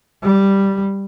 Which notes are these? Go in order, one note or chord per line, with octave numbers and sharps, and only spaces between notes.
G3